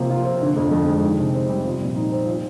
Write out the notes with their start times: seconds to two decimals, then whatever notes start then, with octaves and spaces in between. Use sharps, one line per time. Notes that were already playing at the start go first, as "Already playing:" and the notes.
Already playing: C3 F3 A#3
0.10 F4
0.25 C4
0.41 D3
0.56 F2
0.71 F2
0.88 G#3
1.03 D#3
1.19 C3
1.33 C4
1.49 G3
1.65 F3
1.80 A#2
1.96 D#4
2.12 C4
2.26 F3